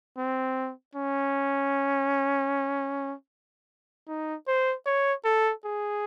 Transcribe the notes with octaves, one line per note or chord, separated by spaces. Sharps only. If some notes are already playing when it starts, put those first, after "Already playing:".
C4
C#4
D#4
C5
C#5
A4
G#4